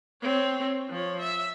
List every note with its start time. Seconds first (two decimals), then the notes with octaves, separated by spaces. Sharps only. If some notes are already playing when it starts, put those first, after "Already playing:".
0.22 C4 C#5
0.90 F3 C#5
1.19 E5